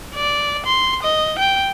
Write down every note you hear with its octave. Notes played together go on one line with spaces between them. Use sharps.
D5
C6
D#5
G5